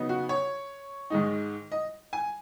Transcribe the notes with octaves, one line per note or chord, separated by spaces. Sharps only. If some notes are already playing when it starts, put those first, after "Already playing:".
Already playing: C#3 F#3 B3 D#4
F#4
C#5
G#2 D#3 G#3 D#4
D#5
G#5